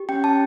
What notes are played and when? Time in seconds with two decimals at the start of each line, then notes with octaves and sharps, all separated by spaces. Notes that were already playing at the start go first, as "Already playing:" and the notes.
Already playing: G4
0.09 C#4 G5
0.24 C#4 A5